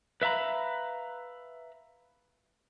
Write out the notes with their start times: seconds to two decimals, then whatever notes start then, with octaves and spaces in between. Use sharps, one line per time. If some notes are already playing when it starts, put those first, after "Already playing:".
0.22 B4 E5 F5 A#5 B5